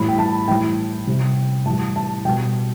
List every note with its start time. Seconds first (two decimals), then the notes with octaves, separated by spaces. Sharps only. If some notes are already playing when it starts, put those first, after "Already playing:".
Already playing: A2 E3 G3 B5
0.09 G5
0.19 A5
0.48 A2 E3 G3 G5
1.07 C3 G3
1.65 A2 E3 G3 A5
1.96 A5
2.25 B2 G3 G5